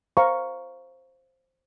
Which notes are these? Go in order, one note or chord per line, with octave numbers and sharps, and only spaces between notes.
C5 F5 A#5 C#6